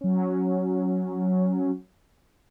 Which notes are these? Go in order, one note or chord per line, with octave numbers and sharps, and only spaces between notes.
F#3 C#4